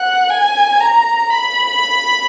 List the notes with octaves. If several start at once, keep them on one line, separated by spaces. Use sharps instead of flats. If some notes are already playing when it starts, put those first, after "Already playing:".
Already playing: F#5
G#5
A#5
B5